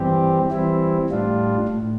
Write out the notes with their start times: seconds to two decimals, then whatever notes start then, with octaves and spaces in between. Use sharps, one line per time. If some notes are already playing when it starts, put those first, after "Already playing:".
Already playing: G2 E3 G3 C4 G4
0.51 E3 G3 C4 E4
1.10 A2 G3 D4 F4
1.68 A2